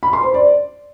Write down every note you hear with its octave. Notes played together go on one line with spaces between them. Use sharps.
B5
C6
C5
D5